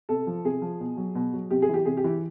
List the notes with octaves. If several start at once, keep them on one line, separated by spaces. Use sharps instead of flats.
C3 A4
F3
C3 G#4
F3
B2
F#3
B2
F#3
C3 G4
G#4
E3 G4
C3 G#4
G4
E3